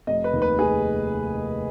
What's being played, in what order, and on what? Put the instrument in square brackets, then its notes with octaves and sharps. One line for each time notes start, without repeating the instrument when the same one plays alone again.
[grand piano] F1 D#5
B4
D#2 D#3
B4
F1 G#4